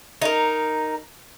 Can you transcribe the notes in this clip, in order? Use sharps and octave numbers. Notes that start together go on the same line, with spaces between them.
D#4 A#4